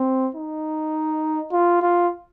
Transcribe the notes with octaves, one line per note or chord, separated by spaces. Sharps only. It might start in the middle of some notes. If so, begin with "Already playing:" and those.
Already playing: C4
D#4
F4
F4